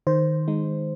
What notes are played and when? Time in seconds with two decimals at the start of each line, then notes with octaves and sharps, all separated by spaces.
0.07 D#3 C5
0.48 G#3 D#4